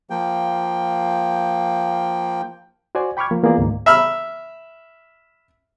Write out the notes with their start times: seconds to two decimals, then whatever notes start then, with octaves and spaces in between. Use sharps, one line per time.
0.10 F3 A#3 G5
2.95 F#4 C5 D5 G#5
3.17 G5 B5 C#6 D6 F6 G#6
3.31 F3 A#3
3.43 E3 A#3 B3 F4 G#4 D5
3.58 D2 G#2 D#3 A#3
3.86 E5 B5 F6